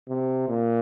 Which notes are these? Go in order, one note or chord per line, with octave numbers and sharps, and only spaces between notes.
C3
A#2